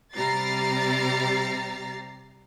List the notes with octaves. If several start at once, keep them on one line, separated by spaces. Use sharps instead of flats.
C3 G3 A#5 A6 C7